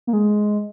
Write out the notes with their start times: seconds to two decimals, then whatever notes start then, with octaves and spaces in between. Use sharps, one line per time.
0.07 A#3
0.13 G#3